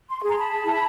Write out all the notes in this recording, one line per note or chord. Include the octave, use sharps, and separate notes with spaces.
C6
C#6
G#4 A#5 C6
A5 B5
E4